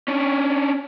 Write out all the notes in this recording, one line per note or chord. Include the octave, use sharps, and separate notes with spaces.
C#4 D4